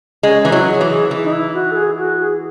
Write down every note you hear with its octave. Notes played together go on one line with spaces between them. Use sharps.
G#3 C#4
E3 E4
F#3
G#4
E3
G#4
E3
D#4
E4
F#4
A4
G#4
F#4
G#4